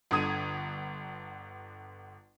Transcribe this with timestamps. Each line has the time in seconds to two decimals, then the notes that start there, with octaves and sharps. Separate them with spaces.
0.11 G1 D3 D#6 G#6 D#7